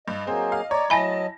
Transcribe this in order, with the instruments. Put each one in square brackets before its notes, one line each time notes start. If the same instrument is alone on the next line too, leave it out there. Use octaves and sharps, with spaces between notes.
[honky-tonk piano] G2 [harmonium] D#5
[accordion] F#3 A#3 G#4 [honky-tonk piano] C4
[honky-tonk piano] F5
[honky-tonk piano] C#5 [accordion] D5 A#5
[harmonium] F#3 D#5 [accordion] A3 [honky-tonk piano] E4 A5 A#6 [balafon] G#5 B5